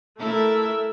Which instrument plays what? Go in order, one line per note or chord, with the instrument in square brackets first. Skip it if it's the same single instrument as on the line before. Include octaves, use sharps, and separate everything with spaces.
[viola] A3 E5 [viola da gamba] E4 A4 A#4